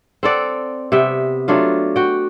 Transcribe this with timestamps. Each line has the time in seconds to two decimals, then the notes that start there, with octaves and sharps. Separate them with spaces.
0.23 C4 A4 D5 F#5
0.92 C3 B3 E5 G5
1.48 F#3 A3 D4 F4
1.96 F#4 G5